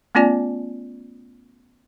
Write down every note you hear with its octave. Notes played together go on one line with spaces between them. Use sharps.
A3 B3 C#4 F4 D5 G#5